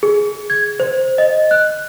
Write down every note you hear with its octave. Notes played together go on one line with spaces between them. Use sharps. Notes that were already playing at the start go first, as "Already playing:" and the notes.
G#4
G#6
C5
D#5
F#6